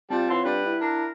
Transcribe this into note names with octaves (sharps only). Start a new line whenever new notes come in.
G3 C4 F4 A5
E3 C#5 F#5 C6
G3 D4 B4
E4
D4 A#4